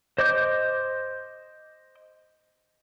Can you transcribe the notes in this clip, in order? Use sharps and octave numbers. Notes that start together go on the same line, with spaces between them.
C5 D#5 D6 G6